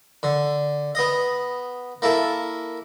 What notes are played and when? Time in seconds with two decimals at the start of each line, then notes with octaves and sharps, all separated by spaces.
0.23 D3
0.95 B3 D#5
2.02 A#3 E4 A4